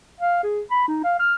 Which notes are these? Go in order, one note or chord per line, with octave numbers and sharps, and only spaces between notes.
F5
G#4
B5
D#4
F5
F6